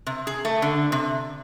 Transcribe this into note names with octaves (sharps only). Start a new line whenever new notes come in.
C3
G#4
A3
D3
C3